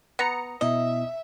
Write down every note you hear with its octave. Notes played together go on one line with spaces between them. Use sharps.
B3 A#5 D#6 C#7
B2 B3 E4 D#5 E5